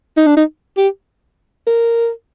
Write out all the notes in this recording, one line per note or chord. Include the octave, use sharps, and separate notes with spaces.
D#4
D4
D#4
G4
A#4